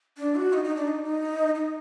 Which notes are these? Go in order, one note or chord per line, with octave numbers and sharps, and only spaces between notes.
D4
F#4
D#4
D#4
D4
D#4
D#4
D#4